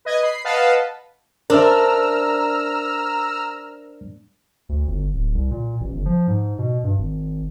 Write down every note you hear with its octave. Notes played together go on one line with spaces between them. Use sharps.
B4 D#5 G#6
B5 C7
B4 D#5 F5 F#5 A5 B5
D4 A#4 C5 E5 A#5 E6 F6
D2
G1
D1
C2
A#2
A1
G1
F3
G#2
B2
G2
G#1